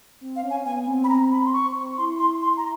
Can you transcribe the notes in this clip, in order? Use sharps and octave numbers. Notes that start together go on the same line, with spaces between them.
C4
F5
C#4
G#5
B3 G#5
C4
B5
A#5
B5
C6
C#6
E4 C6
C6
C6
A#5